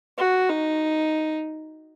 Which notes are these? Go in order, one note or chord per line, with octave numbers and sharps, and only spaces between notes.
F#4
D#4